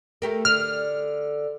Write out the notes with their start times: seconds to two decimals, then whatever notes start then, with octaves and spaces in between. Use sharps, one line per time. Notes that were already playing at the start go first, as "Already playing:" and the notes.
0.22 A3 G4 A#4
0.45 D3 F6